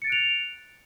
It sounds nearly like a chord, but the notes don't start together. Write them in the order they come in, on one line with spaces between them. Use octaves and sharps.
C#7 A6 D7 F#6 F7